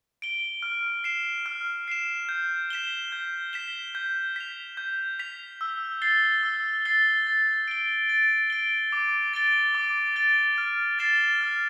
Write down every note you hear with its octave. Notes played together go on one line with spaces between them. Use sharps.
D7 G7
F6
C7 E7
F6
C7 E7
G6
B6 E7 G7
G6
B6 E7 G7
G6
B6 F7
G6
B6 F7
E6
A6 C7 G7
E6
A6 C7 G7
A6
D7 G7
A6
D7 G7
D6
A6 D7 G7
D6
A6 D7 G7
F6
A6 C7 E7 G7
F6